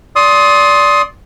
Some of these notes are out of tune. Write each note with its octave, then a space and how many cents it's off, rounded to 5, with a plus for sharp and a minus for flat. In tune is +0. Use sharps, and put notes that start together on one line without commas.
D5 -15 C6 +10 D#6 +20